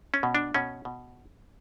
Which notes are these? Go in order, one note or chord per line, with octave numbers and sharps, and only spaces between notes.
C#4
B2
D4
B2 C#4
B2